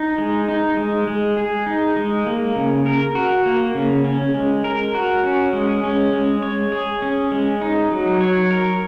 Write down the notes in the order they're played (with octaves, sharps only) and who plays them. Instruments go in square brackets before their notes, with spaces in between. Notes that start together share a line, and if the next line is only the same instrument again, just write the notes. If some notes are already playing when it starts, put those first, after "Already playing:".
Already playing: [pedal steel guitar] D#4
G#3
D#4
G#3
G#3
G#4
D#4
G#3
A#3
C#3
A#4
F#4
A#3
C#3
C#4
G#3
A#4
F#4
C#4
G#3
C#4
G#3
C#5
G#4
C#4
G#3
D#4
F#3
C#5
A#4